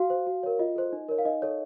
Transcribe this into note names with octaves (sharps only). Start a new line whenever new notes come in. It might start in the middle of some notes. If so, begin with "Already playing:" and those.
Already playing: F#4 F5
C5
F#4
A#4 C#5
F4 D#5
A4 C5
D#4
A#4 C#5
F5
D#4 D#5
A4 C#5